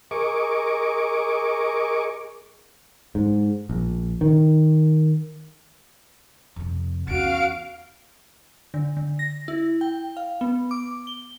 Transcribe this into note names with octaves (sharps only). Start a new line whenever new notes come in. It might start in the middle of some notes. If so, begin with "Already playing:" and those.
G#4 A#4 D#5 C#6 D6
G#2
A#1
D#3
F2 C3
E2 C#4 F#4 F5 D7
D3
D3
A#6
E4
G5
F5
B3
D6
G7